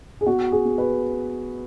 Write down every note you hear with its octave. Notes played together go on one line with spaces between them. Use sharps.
G#4
B3 F#4
G#4
B3
B4